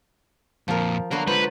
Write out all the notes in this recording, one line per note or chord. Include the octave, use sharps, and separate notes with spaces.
F2 A#2 F3 A#4
D3 F#3 B3 A#4 F5
G#3 F4 B4 C5